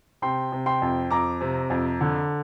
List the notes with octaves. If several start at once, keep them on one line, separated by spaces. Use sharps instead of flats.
C3 G5 C6
C3
G5 C6
F2
F2 A#5 D6
C3
F2
D3